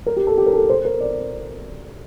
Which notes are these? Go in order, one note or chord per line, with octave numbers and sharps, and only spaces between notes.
A#4
G4
A4
G4
A#4
A4
C5
A#4
D5